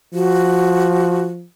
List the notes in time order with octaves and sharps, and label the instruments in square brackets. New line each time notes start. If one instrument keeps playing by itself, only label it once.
[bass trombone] F3 [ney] F#4